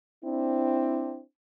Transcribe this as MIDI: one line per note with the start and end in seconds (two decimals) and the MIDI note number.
0.24 1.21 60
0.24 1.21 62
0.24 1.21 64